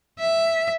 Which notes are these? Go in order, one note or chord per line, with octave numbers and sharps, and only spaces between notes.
E5